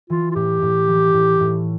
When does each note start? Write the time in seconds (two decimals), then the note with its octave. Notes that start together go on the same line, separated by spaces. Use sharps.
0.10 E3 F4
0.31 F4
0.35 A2 G4
0.62 A2
0.88 E3
1.14 A2
1.40 A2